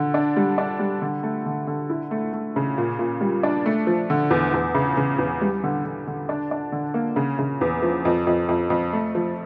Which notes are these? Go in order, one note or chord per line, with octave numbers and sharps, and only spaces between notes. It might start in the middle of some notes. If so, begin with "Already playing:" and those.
Already playing: D3
D4
G3
D4
G3
D3
A3
D3
D3
E4
A3
A3
C#3
A#2
A#2
G3
D4
A3
F3
D3
E2
E2
C#3
C#3
E2
G3
D3
D3
D3
D4
D4
D3
A#3
C#3
C#3
E2
F3
F2
F2
F2
F2
A3
F3